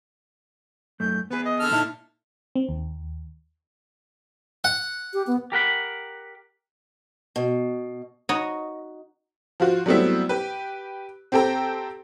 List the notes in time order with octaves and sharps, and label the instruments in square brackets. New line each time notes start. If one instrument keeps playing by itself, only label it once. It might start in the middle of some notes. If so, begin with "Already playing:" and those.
[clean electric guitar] F#2 A3 [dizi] G6
[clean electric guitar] B3 G#4 [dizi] B4
[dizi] D#5
[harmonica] D3 A4 F6
[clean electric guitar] A#2 D#4 E4 [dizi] A5
[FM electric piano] C4
D#2
[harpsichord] F#5
[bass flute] G4
B3
[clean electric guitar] G4 A#4 F#5 B5
[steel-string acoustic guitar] B2
[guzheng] D#4 F#4 C#5 D#5
[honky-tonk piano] F3 F4 F#4
F#3 G3 A3 B3 C4 E4
G4 B4
C4 G4 A4 G5 A#5